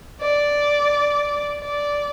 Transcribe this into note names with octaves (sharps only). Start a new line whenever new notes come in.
D5
D5